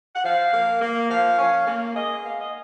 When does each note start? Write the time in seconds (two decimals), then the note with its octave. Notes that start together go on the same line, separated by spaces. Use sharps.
0.15 F#5
0.24 F3 F5
0.53 A#3
0.81 A#3
1.10 F3 F5
1.38 C#4
1.67 A#3
1.95 G#3 D#5
2.23 B3 F5
2.41 D#5